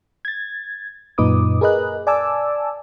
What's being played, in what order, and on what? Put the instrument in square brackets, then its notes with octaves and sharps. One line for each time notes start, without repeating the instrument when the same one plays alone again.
[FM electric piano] G#6 A6
F#2 A#2 D#4 B4 D6 D#6
G#4 A#4 B4 D#5 F#6
D5 G#5 A5 D6 E6